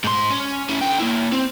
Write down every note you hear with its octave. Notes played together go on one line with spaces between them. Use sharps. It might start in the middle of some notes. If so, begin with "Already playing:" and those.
G#2 C6
C#4
C#4 E4
D3 G5
A#3 E4
C4